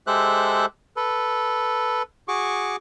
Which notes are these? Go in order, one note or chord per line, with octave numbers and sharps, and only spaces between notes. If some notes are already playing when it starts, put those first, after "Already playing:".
G#3 G4 A4 C5 E5 F#6
A4 B4
F#4 G#4 C#6 D6